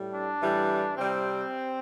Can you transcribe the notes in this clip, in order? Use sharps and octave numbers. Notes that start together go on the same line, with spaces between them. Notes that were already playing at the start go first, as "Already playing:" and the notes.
Already playing: A2 G3
D4
A2 E3 G3
C3 G3 C4